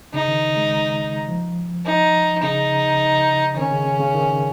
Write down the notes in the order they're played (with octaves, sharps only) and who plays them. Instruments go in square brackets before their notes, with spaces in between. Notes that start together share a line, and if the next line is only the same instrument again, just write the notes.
[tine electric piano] C#3 [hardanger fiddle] D#4
[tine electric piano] D#3
G#3
F3
[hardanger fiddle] D#4
[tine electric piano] C#3 [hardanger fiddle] D#4
[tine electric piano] D#3 [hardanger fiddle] C#4
[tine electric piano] C#3
C#3
C#3
D#3